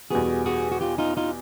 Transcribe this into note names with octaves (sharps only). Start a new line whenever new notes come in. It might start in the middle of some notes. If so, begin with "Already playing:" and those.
E2 B2 G3 B3 F#4 G#4
F#4 G#4
F#4
F4 G4
D#4 F4
D#4 F4